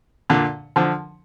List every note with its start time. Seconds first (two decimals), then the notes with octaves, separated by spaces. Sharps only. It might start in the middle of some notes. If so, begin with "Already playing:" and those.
0.30 A#2 D3
0.76 D3 F3